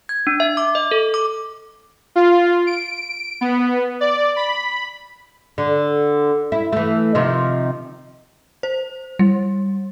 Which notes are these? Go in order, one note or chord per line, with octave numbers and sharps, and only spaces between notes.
G#6
D4
E5
D6
D#5
A4
D6
F4
D7
B3
D5
B5
D3
E4
E3 A3
C3 D#3 F3
C5
G3